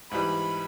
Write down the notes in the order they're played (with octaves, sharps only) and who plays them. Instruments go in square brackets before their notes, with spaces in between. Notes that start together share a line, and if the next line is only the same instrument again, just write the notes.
[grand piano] G#2 E3 G3 [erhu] B5